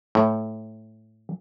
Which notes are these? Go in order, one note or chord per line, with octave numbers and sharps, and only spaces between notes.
A2